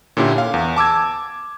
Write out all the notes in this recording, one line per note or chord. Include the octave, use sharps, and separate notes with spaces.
A#2 D3 C#4 E4 G4
F5
E2
A5 D6 E6 G#6